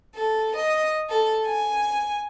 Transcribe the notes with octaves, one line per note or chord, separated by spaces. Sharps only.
A4
D#5
A4
G#5